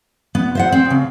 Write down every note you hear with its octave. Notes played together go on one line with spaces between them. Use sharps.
B3
C5 E5 F#5
C4
C#3